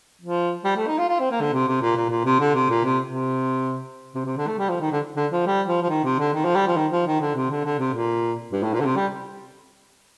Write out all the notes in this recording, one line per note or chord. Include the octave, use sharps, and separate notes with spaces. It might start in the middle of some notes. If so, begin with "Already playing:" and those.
F3
G3
A3
D#4
F4
F4
C4
A#3
D3
C3
C3
A#2
A#2
A#2
C3
D3
C3
A#2
C3
C3
C3
C3
D3
A3
G3
F3
D#3
D3
D3
F3
G3
F3
F3
D#3
C3
D3
D#3
F3
G3
F3
D#3
F3
D#3
D3
C3
D3
D3
C3
A#2
G2
A2
A#2
D3
C3
G3